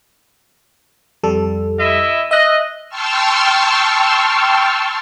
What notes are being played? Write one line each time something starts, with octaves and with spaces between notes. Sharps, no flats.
F2 G3 A4
E4 D#5 E5
D#5 E5 F#6
G5 A5 C6 C#6 E6 F6